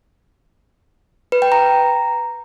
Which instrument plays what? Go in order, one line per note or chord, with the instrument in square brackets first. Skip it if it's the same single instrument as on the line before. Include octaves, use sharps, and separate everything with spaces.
[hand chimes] B4
G5
A#5